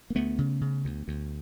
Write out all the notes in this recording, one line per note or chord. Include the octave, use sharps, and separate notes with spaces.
A#3
D2 A3 B3
C#3
C#3
D2
D2